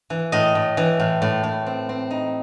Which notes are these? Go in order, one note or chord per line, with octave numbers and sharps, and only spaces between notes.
E3
A2 D#5
A2
E3
A2
A2
A2
C4
C4
D#4